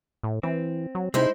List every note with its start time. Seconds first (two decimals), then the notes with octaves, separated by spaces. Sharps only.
0.23 A2
0.43 E3 C4
0.95 F#3
1.14 C3 G#3 D#4 E4 C5 E5